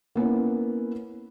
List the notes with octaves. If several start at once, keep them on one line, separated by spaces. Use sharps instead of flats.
A#3 B3 C#4 E4